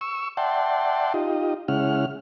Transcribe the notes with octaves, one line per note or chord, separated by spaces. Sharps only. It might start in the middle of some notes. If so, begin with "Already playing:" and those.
C#6 E6
D5 E5 F#5 G5 A5 C6
D#4 F4 G4 D#5
C#3 G#3 C#4 E4 F#5 F6